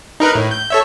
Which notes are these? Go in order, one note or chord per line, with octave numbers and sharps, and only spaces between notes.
D#4 A#4 B4
A2
G6
A4 C#5 E5